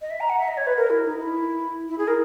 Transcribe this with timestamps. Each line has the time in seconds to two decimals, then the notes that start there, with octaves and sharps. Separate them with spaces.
0.01 D#5
0.10 E5
0.20 A#5
0.29 F#5
0.39 E5
0.48 D#5
0.57 C#5
0.66 B4
0.77 A#4
0.90 E4
1.04 D#4
1.18 E4
1.88 E4
1.98 G#4
2.07 A#4